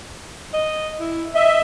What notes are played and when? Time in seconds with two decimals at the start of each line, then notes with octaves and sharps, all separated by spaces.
0.54 D#5
1.00 E4
1.35 D#5 E5